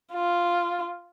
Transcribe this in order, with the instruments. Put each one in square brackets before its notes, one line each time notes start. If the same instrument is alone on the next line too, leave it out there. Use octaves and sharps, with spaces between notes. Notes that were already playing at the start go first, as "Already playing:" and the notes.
[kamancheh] F4